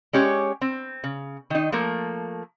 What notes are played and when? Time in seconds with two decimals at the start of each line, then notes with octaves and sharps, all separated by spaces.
0.13 G#3 C#4 G4 C#5
0.61 C4
1.04 C#3
1.50 D#3 D#4
1.72 F3 A3 A#3